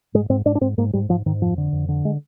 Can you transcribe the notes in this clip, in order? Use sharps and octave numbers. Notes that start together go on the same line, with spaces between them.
G#2 G#3
G#2 C4
G#2 D4
D4
G#2 C4
G#2 A#3
G#2 G3
G#2 F3
G#2 D#3
F2 F3
D3
F2
D3
G#3